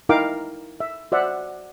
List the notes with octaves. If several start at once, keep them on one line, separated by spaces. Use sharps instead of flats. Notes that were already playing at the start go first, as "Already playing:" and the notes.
D#4 E4 A#4 F5 G5 D6
E5
F#4 C5 D5 E5 F#5